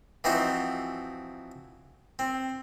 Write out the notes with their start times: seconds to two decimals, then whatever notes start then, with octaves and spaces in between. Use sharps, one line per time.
0.24 E3 F3 C4 D#4 F#4
2.19 C4